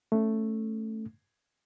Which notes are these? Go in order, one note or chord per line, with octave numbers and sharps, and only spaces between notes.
A3 C#4